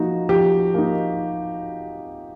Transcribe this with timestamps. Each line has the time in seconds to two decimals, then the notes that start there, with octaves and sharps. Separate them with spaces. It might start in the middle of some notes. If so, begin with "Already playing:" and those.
Already playing: F3 A#3 D#4 F#4
0.29 F3 G4
0.74 A#3 D#4